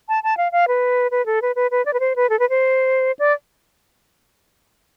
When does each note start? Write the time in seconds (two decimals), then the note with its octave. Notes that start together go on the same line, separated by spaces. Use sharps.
0.09 A5
0.23 A5
0.37 F5
0.52 F5
0.68 B4
1.11 B4
1.26 A4
1.42 B4
1.56 B4
1.71 B4
1.86 D5
1.94 B4
2.00 C5
2.16 B4
2.30 A4
2.39 B4
2.50 C5
3.19 D5